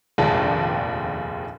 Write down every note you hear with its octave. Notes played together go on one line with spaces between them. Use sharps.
F1 A#1 D#2 G#3 D4 A5